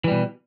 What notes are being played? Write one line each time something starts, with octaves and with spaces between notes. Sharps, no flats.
B2 E3 G3